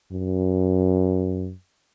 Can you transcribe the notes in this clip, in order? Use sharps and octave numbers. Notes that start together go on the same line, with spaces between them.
F#2